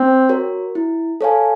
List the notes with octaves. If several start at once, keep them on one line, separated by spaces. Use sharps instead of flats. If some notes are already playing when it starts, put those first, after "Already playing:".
Already playing: C4
F#4 A#4 C#5
E4
A4 C#5 F5 G#5